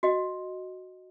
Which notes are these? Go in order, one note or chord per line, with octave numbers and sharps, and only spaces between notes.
F#4 D#5